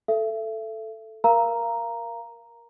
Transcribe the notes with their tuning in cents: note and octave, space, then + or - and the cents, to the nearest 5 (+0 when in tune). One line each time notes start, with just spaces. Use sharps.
A4 +0 E5 +30
A#4 +10 F5 -25 A#5 +0